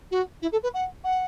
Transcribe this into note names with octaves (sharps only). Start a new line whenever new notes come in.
F#4
E4
A4
B4
F#5
F#5